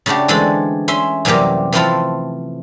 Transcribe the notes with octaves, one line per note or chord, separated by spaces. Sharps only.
C#3 A3 D4 F#4 G4
D3 E3 G#3 A3 C4 A4
C#4 E5 C6
F#2 C3 E3 G3 A#3 G4
E3 F3 A3 C4 E4 F4